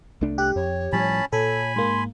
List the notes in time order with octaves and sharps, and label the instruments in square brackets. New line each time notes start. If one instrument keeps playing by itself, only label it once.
[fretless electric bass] C2 A3 D4
[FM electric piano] G4 [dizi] F#6
[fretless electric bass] F2 [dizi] C#5
[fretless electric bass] A2 F3 G3 [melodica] C#4 A5 B5
[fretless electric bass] A#2 [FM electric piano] A4 [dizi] C#5 [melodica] G#5 B5
[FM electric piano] G#2 A#3 [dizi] C6